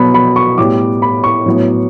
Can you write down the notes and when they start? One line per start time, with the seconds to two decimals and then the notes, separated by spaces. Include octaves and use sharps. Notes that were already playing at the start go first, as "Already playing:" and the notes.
Already playing: B2 F#3 B3 B5
0.14 B5
0.36 C#6
0.58 A2 G3 B3 D6
1.02 B5
1.24 C#6
1.46 A2 F#3 B3